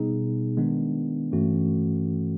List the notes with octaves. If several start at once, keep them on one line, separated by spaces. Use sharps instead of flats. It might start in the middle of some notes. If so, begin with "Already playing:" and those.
Already playing: B2 G3 B3 D#4 G#4
D#3 G#3 B3 D4
G2 E3 A3 C#4 F#4